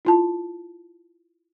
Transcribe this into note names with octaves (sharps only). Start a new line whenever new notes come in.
E4 F4 A5